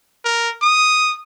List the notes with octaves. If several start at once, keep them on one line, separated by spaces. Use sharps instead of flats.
A#4
D#6